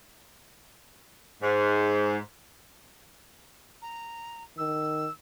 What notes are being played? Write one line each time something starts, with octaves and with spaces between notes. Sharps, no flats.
G#2
A#5
D#3 E6